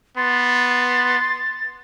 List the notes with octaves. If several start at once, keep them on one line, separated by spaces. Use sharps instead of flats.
B3 C6 A6